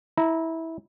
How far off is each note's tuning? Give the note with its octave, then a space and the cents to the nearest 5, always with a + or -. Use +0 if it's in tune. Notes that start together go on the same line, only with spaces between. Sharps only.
E4 -20 A#5 +0